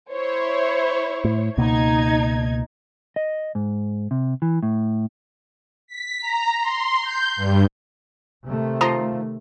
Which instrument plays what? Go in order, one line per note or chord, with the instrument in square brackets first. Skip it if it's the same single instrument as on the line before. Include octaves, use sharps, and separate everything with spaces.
[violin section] E4 C5 C#5
[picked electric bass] A2
[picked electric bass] C#2 B2 A#3 [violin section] D#4 G#6
[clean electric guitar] D#5
G#2
C3
E3
A2
[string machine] B6
A#5
C6
G6
G2
[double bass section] C3 D#3 A3
[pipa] F3 [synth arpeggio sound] A#5 C6 D#6